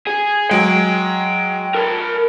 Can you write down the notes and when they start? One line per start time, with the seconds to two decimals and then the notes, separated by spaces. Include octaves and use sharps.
0.07 G#4
0.51 F#3 G#3 G5
1.75 A#4 A5